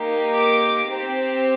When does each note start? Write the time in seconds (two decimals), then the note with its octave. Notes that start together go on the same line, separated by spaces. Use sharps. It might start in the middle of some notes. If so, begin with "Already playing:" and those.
Already playing: A#3 D#4 G4
0.35 D6
0.90 C4 G4